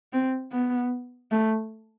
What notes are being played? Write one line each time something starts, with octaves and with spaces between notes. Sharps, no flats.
C4
B3
A3